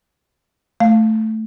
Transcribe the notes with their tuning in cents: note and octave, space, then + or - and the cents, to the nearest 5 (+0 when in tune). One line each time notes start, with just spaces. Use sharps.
A3 +0 F5 +0